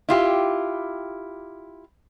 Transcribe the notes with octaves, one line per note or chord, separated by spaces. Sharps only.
E4 F4 G4